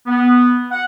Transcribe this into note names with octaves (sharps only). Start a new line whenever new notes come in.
B3
F#5